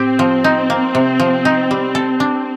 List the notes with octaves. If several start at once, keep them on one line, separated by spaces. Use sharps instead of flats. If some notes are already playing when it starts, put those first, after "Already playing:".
Already playing: A2 C4 G4
F3
D#4
A#3
C3
F3
D#4
G3
A4
D4